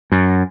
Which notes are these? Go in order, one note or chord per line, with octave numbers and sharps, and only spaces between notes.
F#2